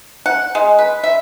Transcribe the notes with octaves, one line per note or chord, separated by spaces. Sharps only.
F#5
G#3
B4
E5